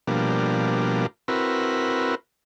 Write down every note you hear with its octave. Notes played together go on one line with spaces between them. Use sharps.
B2 F3 G3 A#3 D4
C4 E4 F#4 A#4 B4